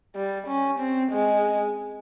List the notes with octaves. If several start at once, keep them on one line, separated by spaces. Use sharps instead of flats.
G3
C#4
C4
G#3